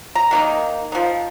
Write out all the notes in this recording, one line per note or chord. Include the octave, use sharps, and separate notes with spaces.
A#5
D#3 A#3 D#4
F3 D#4